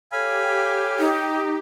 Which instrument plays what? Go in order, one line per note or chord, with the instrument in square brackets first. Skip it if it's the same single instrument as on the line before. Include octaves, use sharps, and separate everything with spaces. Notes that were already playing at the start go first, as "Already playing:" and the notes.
[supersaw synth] G4 [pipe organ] A4 C#5 [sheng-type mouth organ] F5 G#5 B5
[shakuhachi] D#4